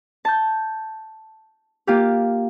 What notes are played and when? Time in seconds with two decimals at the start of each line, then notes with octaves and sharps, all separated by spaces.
0.25 A5 G6
1.87 A#3 F4 G4